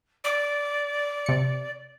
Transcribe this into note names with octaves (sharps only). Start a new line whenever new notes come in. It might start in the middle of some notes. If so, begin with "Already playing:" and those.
D5
C3 C#7